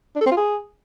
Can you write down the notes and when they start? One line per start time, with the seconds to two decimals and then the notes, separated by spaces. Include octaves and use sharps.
0.16 D4
0.21 A4
0.26 C4
0.31 F4
0.37 G#4